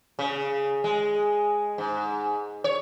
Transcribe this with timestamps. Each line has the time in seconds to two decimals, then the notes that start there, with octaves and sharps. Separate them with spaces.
0.19 C#3
0.84 G#3
1.78 G#2
2.64 C#5